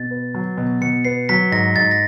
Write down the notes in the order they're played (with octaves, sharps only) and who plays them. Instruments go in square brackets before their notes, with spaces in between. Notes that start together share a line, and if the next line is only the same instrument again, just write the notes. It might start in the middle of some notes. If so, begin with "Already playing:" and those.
Already playing: [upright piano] B2 [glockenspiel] A6
[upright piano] B3
F#3
B2
[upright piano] B2 [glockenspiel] C#7
[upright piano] B3 [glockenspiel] C7
[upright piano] F#3 [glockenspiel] B6
[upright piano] G#2 [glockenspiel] A#6
[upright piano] G#2 [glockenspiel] A6
[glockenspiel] A#6